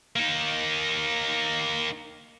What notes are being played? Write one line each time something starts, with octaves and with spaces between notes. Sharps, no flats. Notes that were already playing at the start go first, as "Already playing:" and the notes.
A#3 D#4